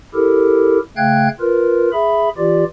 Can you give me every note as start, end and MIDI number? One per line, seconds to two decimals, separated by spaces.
0.14 0.79 64
0.14 0.79 67
0.14 0.79 69
0.14 0.79 70
0.97 1.28 49
0.97 1.28 57
0.97 1.28 77
0.97 1.28 79
0.97 1.28 90
0.97 1.28 92
1.40 1.90 65
1.40 1.90 70
1.40 1.90 71
1.93 2.29 68
1.93 2.29 76
1.93 2.29 83
2.38 2.64 52
2.38 2.64 65
2.38 2.64 67
2.38 2.64 74